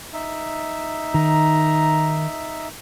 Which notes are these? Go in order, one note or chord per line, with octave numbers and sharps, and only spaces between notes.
D#4 E5
D#3 A#5